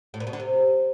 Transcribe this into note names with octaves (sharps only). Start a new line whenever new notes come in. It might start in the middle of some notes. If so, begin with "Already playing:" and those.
A2
A#2
B2
D3
C3